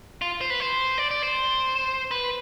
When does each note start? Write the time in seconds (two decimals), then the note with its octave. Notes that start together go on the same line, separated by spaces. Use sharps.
0.22 F4
0.41 C5
0.50 B4
0.60 C5
0.98 D5
1.11 D5
1.23 C5
2.11 B4